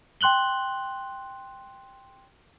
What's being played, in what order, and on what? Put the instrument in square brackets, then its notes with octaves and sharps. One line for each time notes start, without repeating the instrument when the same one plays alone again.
[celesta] G5 C6 F#6 F#7 G7